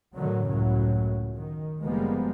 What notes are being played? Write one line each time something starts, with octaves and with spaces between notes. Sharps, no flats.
A2 D3 D#3 F#3
C#2 F#2 A2 C#3 F#3
D#3
F#1 F3 G3 G#3 A#3 B3